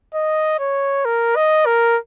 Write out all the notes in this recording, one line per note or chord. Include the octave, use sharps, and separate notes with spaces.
D#5
C#5
A#4
D#5
A#4